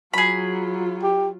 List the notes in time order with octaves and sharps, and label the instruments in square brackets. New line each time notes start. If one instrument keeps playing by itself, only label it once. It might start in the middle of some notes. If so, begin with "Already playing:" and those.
[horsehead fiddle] F#3 F4 [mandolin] G#4 B5
[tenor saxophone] G4